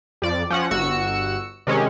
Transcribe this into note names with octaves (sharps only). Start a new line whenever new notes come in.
F2 D5
F3 C#4 F#5
G1 F#4 E6 C#7
C3 D#3 G#3 C#4